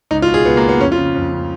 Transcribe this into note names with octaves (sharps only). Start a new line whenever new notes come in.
C#2 D#4
F4
B2
G#4
C#2 B3
A#3
B2
B3
F2 C#4
F4
C#3
F2
C#3